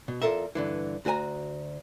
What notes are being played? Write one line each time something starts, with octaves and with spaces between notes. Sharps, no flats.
B2
E2 F4 A4 A#4 E5
G2 D3 E3
D2 F#4 A4 G#5 A#5